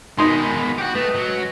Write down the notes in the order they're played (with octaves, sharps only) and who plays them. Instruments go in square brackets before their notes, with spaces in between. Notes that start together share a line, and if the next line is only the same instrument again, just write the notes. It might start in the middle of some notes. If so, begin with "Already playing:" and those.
[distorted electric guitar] B2 G#3 [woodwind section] D#3 B5 [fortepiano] D#4 C6
[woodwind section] B3 G5 [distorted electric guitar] F#4 G4
[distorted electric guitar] A3 [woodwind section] B4 D#5
[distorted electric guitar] F#3
[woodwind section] G#3 C#4